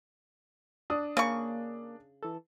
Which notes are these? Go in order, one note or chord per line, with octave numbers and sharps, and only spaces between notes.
D4 D#6
C#3 A#3 C#6
E3 A4